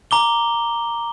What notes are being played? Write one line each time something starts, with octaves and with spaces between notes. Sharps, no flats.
A#5 D6 G7